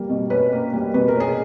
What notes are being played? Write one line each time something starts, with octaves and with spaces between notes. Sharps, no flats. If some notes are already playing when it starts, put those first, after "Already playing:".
Already playing: G3 A#3
B2
C#4 B4
A#3
G3
B2 B4
A#4
C#4 G#4